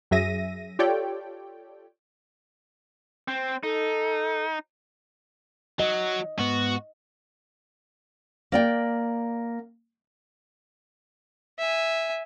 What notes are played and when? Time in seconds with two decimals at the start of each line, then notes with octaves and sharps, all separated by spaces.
0.11 F#2 F#3 G#4 E5 A#6 D#7
0.79 F4 G4 A4 C#5 D5 G5
3.28 C4
3.63 D#4 A4
5.80 F#3 D#5
6.39 G#2 B3 F#4
8.52 A#3 D5 G5
11.58 E5 G#5